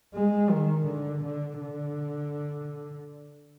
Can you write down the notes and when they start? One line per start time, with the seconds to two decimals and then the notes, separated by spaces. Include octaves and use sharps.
0.15 G#3
0.50 D#3
0.87 D3
1.24 D3
1.61 D3